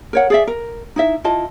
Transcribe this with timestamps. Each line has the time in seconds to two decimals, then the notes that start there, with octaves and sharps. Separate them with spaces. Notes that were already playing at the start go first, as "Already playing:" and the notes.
0.13 A#4 C#5 F#5
0.30 G#4 D5 E5
0.47 A#4
0.96 D#4 E4 E5
1.24 E4 F4 D#5 A5